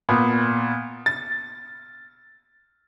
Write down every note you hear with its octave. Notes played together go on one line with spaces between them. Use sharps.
A#2 B3
A6